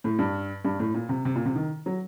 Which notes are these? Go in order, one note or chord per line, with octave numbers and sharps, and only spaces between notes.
A2
G2
G2
A2
A#2
C3
C3
A#2
C3
D#3
F#3